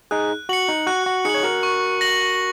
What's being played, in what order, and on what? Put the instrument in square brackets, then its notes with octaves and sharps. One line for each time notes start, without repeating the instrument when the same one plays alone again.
[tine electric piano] D#4 G#4 [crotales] F#6
[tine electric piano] F#4 [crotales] C#7 F#7
[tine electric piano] D#4
[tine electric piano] F#4 [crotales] F#6
[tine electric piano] F#4
[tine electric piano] D#4 G#4 [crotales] C#7 F#7
[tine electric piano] C#5
F#4 A#4
[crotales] C#6
A#6 F#7